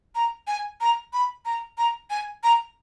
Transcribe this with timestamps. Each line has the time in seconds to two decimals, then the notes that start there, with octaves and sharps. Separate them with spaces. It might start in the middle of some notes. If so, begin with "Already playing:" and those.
0.15 A#5
0.47 G#5
0.81 A#5
1.13 B5
1.45 A#5
1.78 A#5
2.10 G#5
2.43 A#5